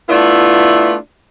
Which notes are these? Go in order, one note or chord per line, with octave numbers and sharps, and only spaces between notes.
A3 B3 D4 E4 F4